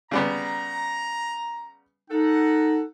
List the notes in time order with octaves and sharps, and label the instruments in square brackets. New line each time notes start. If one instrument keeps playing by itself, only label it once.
[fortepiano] C#3 G3 B3 [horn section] A#5
[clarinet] D#4 [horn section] A4 F#5